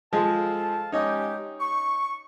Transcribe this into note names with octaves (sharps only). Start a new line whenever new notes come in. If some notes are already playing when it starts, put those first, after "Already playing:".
F3 G#3 G#4 A4 F5 A5
G#3 C#4 D#4 G4 C#5 D#5
C#6